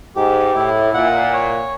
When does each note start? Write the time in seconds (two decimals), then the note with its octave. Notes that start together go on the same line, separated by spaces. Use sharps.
0.16 G#2 G4
0.54 A2 E4
0.94 A#2 F#5
1.33 C#5